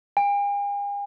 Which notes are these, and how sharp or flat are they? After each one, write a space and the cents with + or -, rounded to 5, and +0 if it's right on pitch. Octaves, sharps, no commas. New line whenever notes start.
G#5 -45